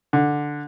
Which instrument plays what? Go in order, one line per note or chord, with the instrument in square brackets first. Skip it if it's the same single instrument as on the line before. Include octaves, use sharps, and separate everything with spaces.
[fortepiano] D3